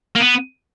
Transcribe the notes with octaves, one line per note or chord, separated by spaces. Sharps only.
A#3
B3